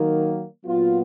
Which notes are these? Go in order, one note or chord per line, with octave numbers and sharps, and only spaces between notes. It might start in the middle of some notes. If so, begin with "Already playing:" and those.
Already playing: D#3 F#3 A#3
A#2 F#3 B3 F4